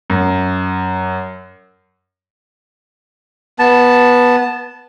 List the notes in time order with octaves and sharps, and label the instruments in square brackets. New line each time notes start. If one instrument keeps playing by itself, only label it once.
[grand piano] F#2
[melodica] B3 A5